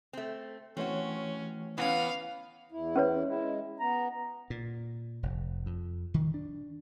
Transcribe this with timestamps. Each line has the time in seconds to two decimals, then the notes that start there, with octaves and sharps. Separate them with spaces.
0.13 A3 C4
0.77 E3 A3 C4 C#4 F#4 C#5
1.78 E3 B3 C#4 F5
2.72 E2 E4
2.96 C#4 B4 C#5
3.24 G#3 E4
3.80 B3 A#5
4.50 A#2
5.23 F1
5.66 F2
6.14 D#3
6.34 D4